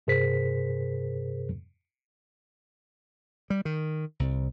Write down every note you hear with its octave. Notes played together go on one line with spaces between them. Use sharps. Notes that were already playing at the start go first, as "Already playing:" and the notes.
G2 C3 G#4 A#4 C5 B6
G3
D#3
C2